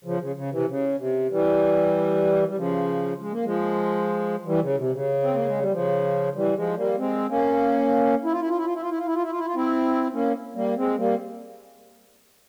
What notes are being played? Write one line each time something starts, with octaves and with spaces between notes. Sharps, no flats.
C#3 F3
C#3
C#3
C3 E3
C#3
C3
E3 G3
G3
C#3 F3
G#3
A#3
F3 G#3
E3 G3
C#3
C3
C#3
C4
A#3
G#3
G3
C#3 F3
E3 G3
F3 G#3
G3 A#3
G#3 C4
A#3 C#4
E4
F4
E4
F4
E4
F4
E4
F4
E4
F4
E4
F4
E4
F4
E4
F4
C4 E4
A#3 C#4
G3 A#3
G#3 C4
G3 A#3